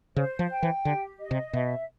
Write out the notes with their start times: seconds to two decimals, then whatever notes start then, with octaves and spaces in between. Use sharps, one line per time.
0.16 C#3 C5
0.39 F3
0.51 G5
0.63 E3
0.85 D3 G4
1.20 D#5
1.31 C3
1.53 B2 E5